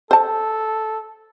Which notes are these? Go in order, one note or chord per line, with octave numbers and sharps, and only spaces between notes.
A4 C5 A5